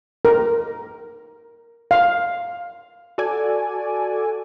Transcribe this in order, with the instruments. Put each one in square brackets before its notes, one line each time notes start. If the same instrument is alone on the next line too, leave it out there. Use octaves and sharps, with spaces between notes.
[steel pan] A#4
F5
[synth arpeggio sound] F#4 A4 D5 G#5